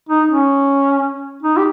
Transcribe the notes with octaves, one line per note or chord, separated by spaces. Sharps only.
D#4
C#4
D#4
G4